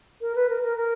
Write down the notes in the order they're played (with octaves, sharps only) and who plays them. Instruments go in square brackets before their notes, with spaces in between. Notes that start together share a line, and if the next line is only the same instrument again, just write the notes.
[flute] A#4
B4
A#4
A#4
A#4